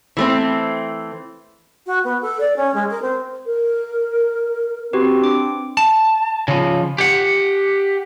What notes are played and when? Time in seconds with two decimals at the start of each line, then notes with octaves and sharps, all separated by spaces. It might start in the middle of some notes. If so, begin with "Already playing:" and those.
0.17 E3 A3 C4
1.86 F#4
2.04 B3
2.21 A4
2.40 D5
2.56 C#4
2.74 G#3
2.90 A#4
3.02 C4
3.46 A#4
4.93 C4 F#4 G4 B4
5.21 D4 D6
5.77 A5
6.48 C#3 F3
6.98 G4 F#5